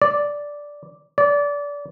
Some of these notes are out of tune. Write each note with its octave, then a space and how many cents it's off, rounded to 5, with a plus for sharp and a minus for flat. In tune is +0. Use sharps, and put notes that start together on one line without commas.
D5 -5
D5 -25